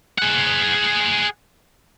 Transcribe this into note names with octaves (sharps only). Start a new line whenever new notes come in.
G#4 F#5